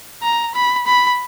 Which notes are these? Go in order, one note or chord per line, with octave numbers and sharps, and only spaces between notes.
A#5
B5
B5